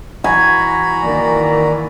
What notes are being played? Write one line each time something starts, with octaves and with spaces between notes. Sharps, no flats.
E3 F#4 G#5 A#5 B5
D#3 E3 A#3 D5